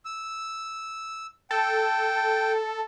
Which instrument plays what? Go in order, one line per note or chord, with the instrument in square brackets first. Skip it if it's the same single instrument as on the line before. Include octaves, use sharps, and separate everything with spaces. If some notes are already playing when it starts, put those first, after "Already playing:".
[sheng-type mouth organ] E6
[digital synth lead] A4 [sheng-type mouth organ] G5